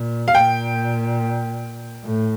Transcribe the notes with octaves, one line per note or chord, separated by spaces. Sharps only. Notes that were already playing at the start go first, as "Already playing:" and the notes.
Already playing: A#2
F5
A#2 G5
A2